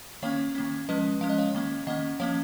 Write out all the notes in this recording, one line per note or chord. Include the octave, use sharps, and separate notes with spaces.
D#3 A#3 C#4 C#5 F5
D#3 A#3 C#4
F3 G#3 C#4 B4 D#5
F3 G#3 C#4 F5
D#5
C#5 F5
D#3 A#3 C#4
D#3 A#3 C#4 D#5 F#5
F3 A#3 C#4 C#5 F5